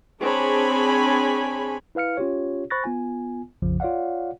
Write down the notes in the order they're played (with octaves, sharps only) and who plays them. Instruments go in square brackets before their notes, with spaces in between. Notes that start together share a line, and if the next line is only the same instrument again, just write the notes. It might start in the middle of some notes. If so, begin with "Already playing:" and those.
[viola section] C4 D4 G#4 C#5 G#5 B5
[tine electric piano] E4 B4 F5 F6 C#7
C#4 F4 G4 C#5
C5 B5 C#6 F#6 A6 A#6
B3 F4 G#5
A#1 F2 C#3 F3
F4 C#5 D5 F5 F#5